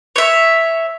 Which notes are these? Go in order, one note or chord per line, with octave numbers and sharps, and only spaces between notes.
C#5 E5